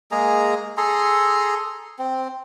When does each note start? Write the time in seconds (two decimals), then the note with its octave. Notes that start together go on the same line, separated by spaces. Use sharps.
0.11 G#3 A#3 G#4 A#5
0.77 G#4 A4 A#5 C6
1.99 C4